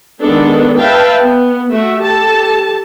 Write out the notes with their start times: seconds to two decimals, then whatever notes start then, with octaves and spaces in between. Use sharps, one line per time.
0.21 D#3 G#3 B3 D4 A4
0.79 B4 E5 F5 G5 A5
1.23 B3
1.70 A3 F#4 E5
2.00 G4 A4 A5